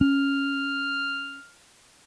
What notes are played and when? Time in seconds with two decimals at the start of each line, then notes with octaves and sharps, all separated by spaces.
0.01 C#4 F6